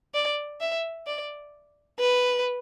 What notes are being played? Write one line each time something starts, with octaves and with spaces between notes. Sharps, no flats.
D5
E5
D5
B4